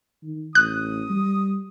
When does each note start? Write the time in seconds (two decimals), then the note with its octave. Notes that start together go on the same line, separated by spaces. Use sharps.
0.23 D#3
0.55 A1 D#6 F#6
1.09 G3